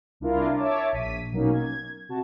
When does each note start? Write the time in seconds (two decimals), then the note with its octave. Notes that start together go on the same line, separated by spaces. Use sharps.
0.20 C2 D4 E4 F4 A#4
0.55 C#5 E5 A5 D6
0.92 A#1 B6 D#7
1.32 B2 F#3 A#3 C#4 D#4
1.53 G#6
2.09 C3 F#4 A5